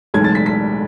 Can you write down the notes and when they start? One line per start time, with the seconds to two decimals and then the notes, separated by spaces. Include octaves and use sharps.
0.14 B1 A2 E3 G#3 G#6
0.24 A6
0.35 B6
0.46 B6